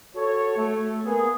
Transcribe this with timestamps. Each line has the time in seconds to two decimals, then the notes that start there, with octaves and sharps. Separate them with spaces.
0.16 F#4 A4 C#5
0.56 A3
1.05 A#3 B3 G#4